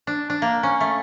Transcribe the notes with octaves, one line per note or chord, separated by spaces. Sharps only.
D4
D4
A#3
C#4
A3